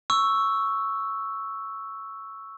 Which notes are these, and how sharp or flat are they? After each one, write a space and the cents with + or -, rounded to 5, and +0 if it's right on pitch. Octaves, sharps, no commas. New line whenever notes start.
C#6 +0 E6 +0